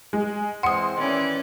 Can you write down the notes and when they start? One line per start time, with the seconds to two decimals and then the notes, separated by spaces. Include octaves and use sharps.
0.13 G#3
0.63 E3 G#3 C4 F#5 C6 D#6 C#7
0.98 D#3 E3 C#4 D5